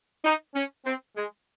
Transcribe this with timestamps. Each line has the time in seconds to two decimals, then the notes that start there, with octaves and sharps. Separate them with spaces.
0.24 D#4
0.54 C#4
0.85 C4
1.16 G#3